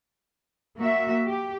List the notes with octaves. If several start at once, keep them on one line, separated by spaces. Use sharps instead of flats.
A#3 F#4 E5
G4